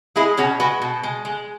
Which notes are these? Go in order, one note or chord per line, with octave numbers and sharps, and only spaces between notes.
G#3 E4 G#4
B2 C#4 F#4
G#3 F#4 B4
B2
G#3
G#3